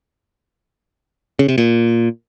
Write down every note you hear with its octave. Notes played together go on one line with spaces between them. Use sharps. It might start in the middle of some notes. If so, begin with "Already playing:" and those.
C#3
C3
A#2